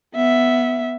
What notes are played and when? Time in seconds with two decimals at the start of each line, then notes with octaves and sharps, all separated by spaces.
0.15 B3 E5